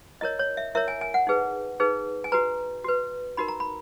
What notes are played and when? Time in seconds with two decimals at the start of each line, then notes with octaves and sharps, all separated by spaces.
0.21 E4 A#4 C#5 D#5
0.39 C#5
0.57 E5
0.75 E4 A#4 C#5 E5
0.88 G#5
1.01 G#5
1.14 F#5
1.27 D#4 G#4 B4
1.80 D#4 G#4 B4
2.24 G#5
2.32 F#4 B4 A#5
2.84 F#4 B4
3.37 D#4 F#4 A#4 B5
3.48 A#5
3.60 B5